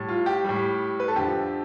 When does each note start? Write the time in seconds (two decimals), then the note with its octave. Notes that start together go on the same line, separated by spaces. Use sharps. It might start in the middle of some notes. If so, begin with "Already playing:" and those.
Already playing: A2 G3
0.08 F4
0.26 G4
0.44 A2 G3
1.00 B4
1.08 A4
1.15 F2 D3 F3 G4